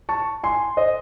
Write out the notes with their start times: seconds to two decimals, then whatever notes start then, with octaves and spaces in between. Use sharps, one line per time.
0.09 A5 C#6
0.44 G#5 C6
0.77 C5 D#5